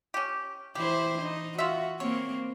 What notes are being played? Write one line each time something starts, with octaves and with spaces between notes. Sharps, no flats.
C#4 G4
E3 E4 G4 C5
D#4
F4 F#4 E5
A#3 C4 C#5